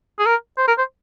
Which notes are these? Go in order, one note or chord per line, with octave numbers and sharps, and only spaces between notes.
G#4
A#4
C5
A#4
C5